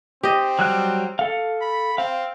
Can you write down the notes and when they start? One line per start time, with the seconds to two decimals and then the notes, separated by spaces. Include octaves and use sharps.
0.23 C4 G4 D#5
0.59 F#3 G3 F#6
1.19 A4 F5
1.61 B5
1.98 C4 F5